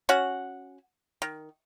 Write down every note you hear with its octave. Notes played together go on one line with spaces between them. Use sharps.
C#4 F#4 F#5
D#3